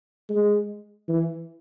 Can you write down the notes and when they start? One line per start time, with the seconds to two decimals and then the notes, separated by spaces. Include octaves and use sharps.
0.30 G#3
1.08 E3